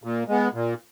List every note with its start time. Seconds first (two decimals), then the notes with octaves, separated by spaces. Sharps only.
0.04 A#2
0.28 G#3 B3
0.54 A#2